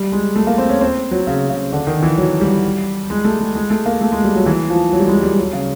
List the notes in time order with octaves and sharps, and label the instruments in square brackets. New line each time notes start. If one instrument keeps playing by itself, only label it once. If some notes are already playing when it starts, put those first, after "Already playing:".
Already playing: [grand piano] G3
G#3
A3
A#3
C4
C#4
C4
F#3
C#3
C#3
D3
D#3
E3
F#3
G3
G#3
A3
G#3
G#3
A3
A#3
A3
G#3
G3
F#3
E3
F3
F#3
G3
G#3
G3
F#3
C#3